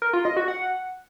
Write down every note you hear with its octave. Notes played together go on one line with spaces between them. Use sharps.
A#4
F4
D#5
F#4
F#5